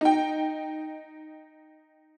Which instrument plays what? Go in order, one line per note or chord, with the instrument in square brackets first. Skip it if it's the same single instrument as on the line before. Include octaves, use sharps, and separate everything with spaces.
[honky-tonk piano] D#4 G5